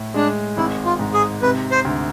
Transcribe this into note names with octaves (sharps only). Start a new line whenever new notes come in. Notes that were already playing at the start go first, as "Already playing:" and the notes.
Already playing: A2
G#3 D4
G#1 E4
F4
G#2
G#4
C3 B4
C5
D2